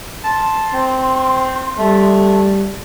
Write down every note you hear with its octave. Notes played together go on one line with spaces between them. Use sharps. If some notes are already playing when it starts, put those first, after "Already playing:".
A5 C6
C4
G3 A3